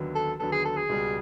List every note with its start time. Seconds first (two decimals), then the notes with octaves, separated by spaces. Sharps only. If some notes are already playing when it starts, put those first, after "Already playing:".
Already playing: D#2 D3 F#3 B3
0.15 A4
0.39 D#2 D3 F#3 B3 A4
0.52 G#4
0.65 A4
0.77 G#4
0.89 C#2 B2 G3